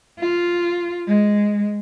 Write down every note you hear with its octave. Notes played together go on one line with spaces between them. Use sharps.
F4
G#3